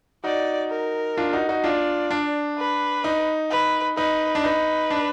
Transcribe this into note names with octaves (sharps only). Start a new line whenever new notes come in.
D#4 F#4 D5
A#4
D4 F4
D#4 F#4
D#4 F#4
D4 F4 D5
D4
B4
D#4
B4
D#4 B4
D4
D#4 B4
D4